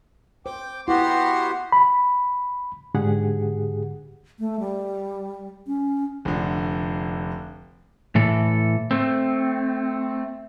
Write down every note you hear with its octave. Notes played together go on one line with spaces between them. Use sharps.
C5 G5 D6
B3 E4 F#4 G4 F#5 C6
B5
G#2 D3 G4 G#4 F#5
A3
G3
C#4
F1 D3
A2 E3 A4
A3 C4